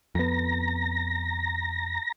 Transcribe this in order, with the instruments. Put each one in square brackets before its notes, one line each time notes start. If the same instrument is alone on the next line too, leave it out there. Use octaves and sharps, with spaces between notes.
[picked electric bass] F2 B3 [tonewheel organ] A#5 A#6